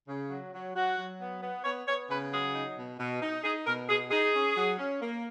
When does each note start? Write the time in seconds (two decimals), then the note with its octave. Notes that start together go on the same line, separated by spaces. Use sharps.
0.08 C#3
0.31 F#3
0.54 F#3
0.75 F#3 F#4
0.97 F#3
1.21 B3
1.42 B3
1.64 B3 C#5
1.87 B3 C#5
2.09 C#3 B4
2.32 F#3 G#4
2.54 D#4
2.77 B2
2.99 B2
3.22 D#4
3.44 D#4 G#4
3.66 B2 A#4
3.89 B2 G#4
4.11 D#4 G#4
4.34 C#4
4.56 F#3
4.78 C#4
5.01 A#3